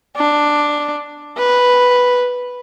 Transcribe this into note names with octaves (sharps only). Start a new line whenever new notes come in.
D4
B4